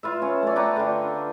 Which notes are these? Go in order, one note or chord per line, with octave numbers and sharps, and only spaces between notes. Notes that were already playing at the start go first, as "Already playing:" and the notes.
F4 B4 E5
C#4
A3 D5
B4 F#5 G5 A#5
D3 F4